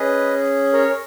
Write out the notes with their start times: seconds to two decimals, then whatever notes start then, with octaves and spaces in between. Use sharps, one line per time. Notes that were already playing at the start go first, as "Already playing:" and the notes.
Already playing: C#4 G#4 B4 D#5
0.73 A#4 C#5